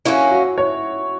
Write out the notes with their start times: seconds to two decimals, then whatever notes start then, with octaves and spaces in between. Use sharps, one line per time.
0.05 F#3 A#3 C#4 E4
0.31 F#4
0.58 C#5